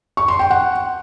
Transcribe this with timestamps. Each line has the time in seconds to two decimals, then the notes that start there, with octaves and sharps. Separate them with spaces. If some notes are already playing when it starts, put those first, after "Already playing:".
0.17 C#6
0.28 C6
0.39 G5
0.50 F#5